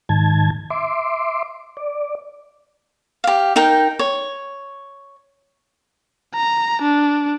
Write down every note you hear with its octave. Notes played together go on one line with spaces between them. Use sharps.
G#2 D#3 A5 G#6
E5 C6 D6
D5
G4 F5
D#4 A#4 G5
C#5
A#5
D4